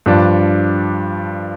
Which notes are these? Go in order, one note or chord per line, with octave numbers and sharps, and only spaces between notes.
G2 F3 D4